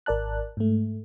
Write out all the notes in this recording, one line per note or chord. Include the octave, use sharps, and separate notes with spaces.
G#1 A#4 D5 A5 F#6
G#2 A3